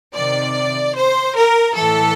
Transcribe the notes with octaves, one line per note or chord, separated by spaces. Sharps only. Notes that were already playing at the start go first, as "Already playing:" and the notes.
C3 D#3 D5
C5
A#4
A2 E3 A4